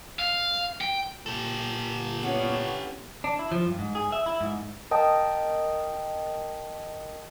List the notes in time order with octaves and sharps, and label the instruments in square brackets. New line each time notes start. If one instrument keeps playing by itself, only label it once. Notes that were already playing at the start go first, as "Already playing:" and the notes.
[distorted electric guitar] F5
G5
[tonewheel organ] A#2 [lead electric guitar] G4 A4
[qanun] B3 [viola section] C#4 D4 E4
[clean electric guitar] D4
E4
F3
G2
G#2
G#4
E5
E4
G#2
[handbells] A#4 D#5 G5 A5 D#6